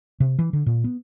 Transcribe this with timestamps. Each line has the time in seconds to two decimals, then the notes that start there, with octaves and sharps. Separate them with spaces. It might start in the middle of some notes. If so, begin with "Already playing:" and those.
0.20 C3
0.39 E3
0.53 D3
0.66 A#2
0.84 B3